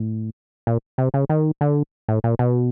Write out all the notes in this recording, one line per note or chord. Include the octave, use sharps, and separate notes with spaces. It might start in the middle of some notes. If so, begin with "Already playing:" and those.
Already playing: A2
A#2
C3
C#3
D#3
D3
A2
A#2
B2